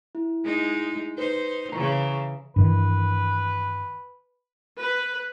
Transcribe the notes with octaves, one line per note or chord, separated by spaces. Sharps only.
E4
G#3 D#4
D#4 B4 C5
C#3 E3 A#5 C#6
G2 D#3 E3 B4
B4